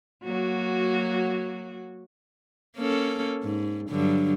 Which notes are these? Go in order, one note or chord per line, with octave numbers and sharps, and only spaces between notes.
F#3 A#3 F#4
A#3 C#4 A4
G#2
G2 D3 F#3